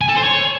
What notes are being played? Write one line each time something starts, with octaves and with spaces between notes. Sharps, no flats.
G#5
A4
C5
C#5